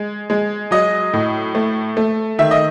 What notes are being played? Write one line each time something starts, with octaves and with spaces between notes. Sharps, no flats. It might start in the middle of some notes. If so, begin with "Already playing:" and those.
Already playing: G#3
G#3
F#3 D#5
A2
A3
A3
D#3 E5
D#5